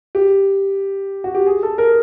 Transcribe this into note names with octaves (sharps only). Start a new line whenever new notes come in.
G4
F#4
G4
G#4
A4
A#4